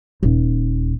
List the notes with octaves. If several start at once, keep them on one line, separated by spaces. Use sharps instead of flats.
D#1